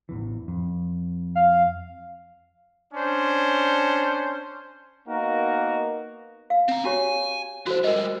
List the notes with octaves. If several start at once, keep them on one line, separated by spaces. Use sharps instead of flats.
A1 E2 E3
F2
F5
C#4 D4 C5
A#3 B3 D#4 F#4 A#4
F5
C4 A#5
F#4 G4 C#5 G#5
E3 F#4 A4 C5
G3 G#3 A#4 D#5